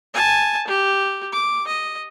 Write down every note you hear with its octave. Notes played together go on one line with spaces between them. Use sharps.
G#5 A5
G4
D6
D#5